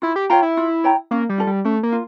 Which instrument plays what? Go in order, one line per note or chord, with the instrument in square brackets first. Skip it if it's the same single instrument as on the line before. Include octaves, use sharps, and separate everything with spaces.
[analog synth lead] E4 [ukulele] F4
[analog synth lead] G4
[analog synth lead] F4 [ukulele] C#5 G5 A#5
[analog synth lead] E4
[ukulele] F4
C#5 G5 A#5
[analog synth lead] A#3 [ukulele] C#4
[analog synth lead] G3
[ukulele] F4 A4
[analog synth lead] G3
[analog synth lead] A3 [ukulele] C#4
[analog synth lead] A#3
[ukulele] F4